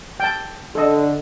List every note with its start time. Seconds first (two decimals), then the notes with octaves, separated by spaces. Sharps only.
0.20 G5 A5
0.75 D3 A4 D#5